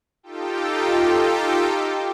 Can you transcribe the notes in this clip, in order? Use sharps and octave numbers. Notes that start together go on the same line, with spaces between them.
D#4 F4 G4 A4 G5